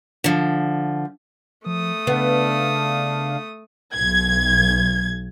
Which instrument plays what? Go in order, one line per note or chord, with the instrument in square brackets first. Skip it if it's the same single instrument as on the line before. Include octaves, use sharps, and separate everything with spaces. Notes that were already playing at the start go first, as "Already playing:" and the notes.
[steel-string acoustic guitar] D3 F3
[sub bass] F3 [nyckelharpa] A3 D#6
[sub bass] C#3 [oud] B3 [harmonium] D4 F5
[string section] B1 G#6